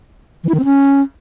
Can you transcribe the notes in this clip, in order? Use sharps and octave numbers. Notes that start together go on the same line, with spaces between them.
E3
E4
D#3
C4
C#4